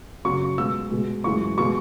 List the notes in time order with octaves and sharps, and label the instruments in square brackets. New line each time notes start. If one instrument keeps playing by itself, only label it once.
[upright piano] F#2 C#3 F#3 C#6
B2 G#3 E6
B2 G#3
F#2 E3 G#3 C#6
B2 G#3 C#6